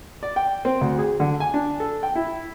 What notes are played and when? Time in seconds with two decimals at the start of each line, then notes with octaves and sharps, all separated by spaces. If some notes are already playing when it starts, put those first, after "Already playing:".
0.23 D5
0.36 G5
0.65 C4
0.81 D2
0.98 G#4
1.20 D3
1.40 G#5
1.54 D4
1.80 A4
2.03 G5
2.15 E4